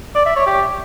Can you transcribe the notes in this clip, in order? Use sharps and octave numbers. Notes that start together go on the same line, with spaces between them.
D5
E5
C#5
G4